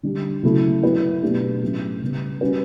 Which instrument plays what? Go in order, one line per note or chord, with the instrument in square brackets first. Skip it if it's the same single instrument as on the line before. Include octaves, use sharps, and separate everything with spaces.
[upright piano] D3 G3 D4
C#3 F#3 A3 E4 A4
F#3 B3 E4 B4
B2 F#3 A3 D4 G4
A2 F#3 A3 C#4
C#3 G3 B3
G3 C#4 F#4 B4